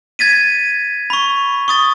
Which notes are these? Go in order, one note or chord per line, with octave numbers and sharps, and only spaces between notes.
G#6 A6 B6 D#7
B5 C#6
C#6 D#6 A6